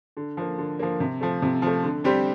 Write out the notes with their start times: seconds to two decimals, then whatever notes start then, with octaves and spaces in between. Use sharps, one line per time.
0.17 D3
0.37 F3 A#3
0.58 D3
0.79 F3 A#3
1.00 C3
1.21 F3 A3
1.42 C3
1.62 F3 A3
1.83 D3
2.04 G3 C4 G4 C5